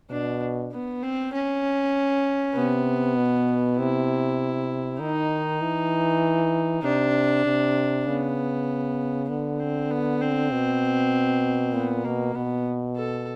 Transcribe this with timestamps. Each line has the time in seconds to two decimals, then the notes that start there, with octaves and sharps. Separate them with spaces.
0.10 B2 D4
0.72 B3
1.03 C4
1.33 C#4
2.55 C3 B3
3.16 B2
3.77 C3 E4
5.00 D#3 D#4
5.61 E3
6.83 C3 D4
7.46 C3
8.06 C#3 B3
9.29 D3 B3
9.59 C4
9.90 B3
10.21 C4
10.51 B2
11.73 A#2 B3
12.04 B2 A#3
12.35 B2 B3
12.96 A4